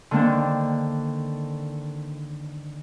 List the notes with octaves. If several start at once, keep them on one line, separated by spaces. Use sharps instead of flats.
D3 D#3 A#3 C4 D4